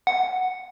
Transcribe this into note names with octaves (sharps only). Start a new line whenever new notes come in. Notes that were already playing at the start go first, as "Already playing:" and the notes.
F#5